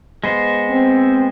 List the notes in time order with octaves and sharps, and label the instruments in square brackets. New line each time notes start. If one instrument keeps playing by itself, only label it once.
[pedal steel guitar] G#3 B3 C5
[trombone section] C4